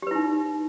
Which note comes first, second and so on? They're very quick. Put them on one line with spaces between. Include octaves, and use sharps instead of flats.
G4 B4 E4 D#4